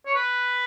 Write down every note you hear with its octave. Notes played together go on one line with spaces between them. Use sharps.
C#5
B4